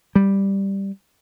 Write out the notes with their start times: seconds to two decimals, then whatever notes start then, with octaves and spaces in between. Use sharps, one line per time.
0.15 G3